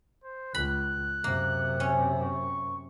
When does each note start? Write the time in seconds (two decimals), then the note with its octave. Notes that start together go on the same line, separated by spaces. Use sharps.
0.24 C5
0.55 C#2 B5 F#6
1.24 F#2 C3 A#3
1.80 C#4
2.24 C#6